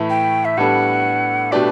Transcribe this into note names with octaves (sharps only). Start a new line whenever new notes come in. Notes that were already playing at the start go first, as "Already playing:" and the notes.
Already playing: A2 E3 A3 E4
G5
E5
A2 G3 B3 D4 A4 F#5
B2 A3 D4 G4 B4 D5